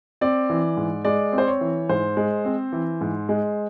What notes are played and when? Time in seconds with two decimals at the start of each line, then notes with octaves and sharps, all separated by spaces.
0.21 C4 D5
0.50 E3
0.77 G#2
1.05 G#3 D5
1.32 C4
1.38 C5
1.47 C#5
1.61 E3
1.89 G#2 C5
2.17 G#3
2.45 C4
2.73 E3
3.01 G#2
3.29 G#3